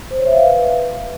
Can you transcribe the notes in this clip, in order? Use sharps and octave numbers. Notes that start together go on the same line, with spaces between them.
C5
C#5
E5
F5
B4